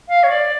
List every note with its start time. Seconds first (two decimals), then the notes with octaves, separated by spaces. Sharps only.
0.08 F5
0.23 C#5
0.29 D5